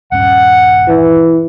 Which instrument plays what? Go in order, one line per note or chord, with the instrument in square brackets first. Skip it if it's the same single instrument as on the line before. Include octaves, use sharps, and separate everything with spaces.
[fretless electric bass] D#1 G2 C#4 [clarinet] F#5
[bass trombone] E3